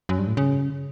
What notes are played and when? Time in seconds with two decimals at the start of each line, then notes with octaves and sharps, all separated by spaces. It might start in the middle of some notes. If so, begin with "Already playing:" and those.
0.09 F#2
0.19 G2
0.27 A2
0.37 C#3